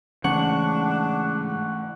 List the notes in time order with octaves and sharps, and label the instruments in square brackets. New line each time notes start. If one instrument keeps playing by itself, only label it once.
[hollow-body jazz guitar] G#2 C#3 [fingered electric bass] E3 A3 [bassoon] D4 [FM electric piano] F#5 C#6 F#6